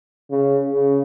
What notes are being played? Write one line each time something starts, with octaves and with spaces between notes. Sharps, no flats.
C#3
C#3